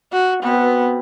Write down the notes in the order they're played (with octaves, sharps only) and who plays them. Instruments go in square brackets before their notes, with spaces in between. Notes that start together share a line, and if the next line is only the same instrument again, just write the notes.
[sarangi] F#4
[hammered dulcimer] B2 C4 [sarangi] B3